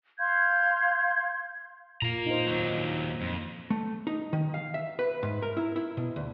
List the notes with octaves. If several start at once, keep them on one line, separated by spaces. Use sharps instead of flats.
F5 C6 G6 G#6
A#2 F5 A#5
D#4 C5
D#2 F#3
F2
A3
D#4
D#3
F5
E5
B4
G#2
A#4
E4
E4
B2
D2